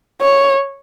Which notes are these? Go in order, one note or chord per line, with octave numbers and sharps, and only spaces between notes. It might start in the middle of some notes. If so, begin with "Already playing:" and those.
C#5